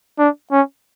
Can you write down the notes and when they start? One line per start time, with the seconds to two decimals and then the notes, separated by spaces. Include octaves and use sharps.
0.19 D4
0.51 C#4